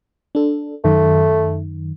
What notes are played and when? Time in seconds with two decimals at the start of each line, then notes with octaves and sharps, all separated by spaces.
0.35 D4 A4
0.84 F#2 D#3 A3